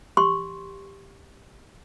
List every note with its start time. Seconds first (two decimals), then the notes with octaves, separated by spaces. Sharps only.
0.17 G4 C6 C#6